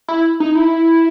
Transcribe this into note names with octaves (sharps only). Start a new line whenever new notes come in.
E4
D#4
E4